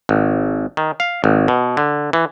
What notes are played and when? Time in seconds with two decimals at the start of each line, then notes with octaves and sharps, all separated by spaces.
0.09 G#1
0.77 D#3
1.00 F5
1.24 G#1
1.48 B2
1.77 D3
2.13 E3